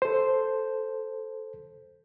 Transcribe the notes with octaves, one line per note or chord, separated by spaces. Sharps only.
A4 C5